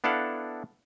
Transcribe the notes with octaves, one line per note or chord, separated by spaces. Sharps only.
B3 D4 E4 A4 F5 F#5